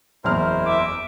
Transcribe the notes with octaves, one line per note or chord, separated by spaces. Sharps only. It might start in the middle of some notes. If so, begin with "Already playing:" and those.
F#1 E2 E4 A#4 C5 F6
E5 D6